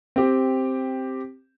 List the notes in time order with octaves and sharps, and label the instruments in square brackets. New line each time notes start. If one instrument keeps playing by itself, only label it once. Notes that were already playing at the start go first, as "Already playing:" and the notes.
[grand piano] C4 G4